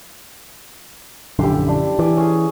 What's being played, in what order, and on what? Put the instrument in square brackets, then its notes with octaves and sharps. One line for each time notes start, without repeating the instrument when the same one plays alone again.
[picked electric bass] A#1 F#2 D3 [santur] E4 G4 C6
[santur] D4 E4
[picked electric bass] E3 [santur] D5 G#5
[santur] C#4 G#4